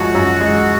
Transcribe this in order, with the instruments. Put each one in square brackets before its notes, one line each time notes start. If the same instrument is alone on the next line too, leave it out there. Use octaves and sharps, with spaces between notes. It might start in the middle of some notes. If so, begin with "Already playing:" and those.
Already playing: [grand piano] F#2 F3 G#3 [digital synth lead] F#4
[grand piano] F#2
G#3